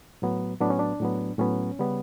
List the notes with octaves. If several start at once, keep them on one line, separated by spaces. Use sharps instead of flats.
A2 F#3 B3
A2 F#3 B3 D4
C#4
D4
A2 F#3 B3
A2 F#3 B3 C#4
C#3 G3 B3